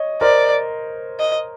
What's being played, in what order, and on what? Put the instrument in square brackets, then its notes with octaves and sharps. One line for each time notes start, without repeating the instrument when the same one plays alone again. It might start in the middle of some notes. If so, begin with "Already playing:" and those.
Already playing: [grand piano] C#5 D#5
[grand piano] A#4 C5 [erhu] D5
[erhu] D#5